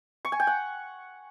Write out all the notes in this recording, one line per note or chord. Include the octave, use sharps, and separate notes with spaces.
C#6
G#5
G5
F#5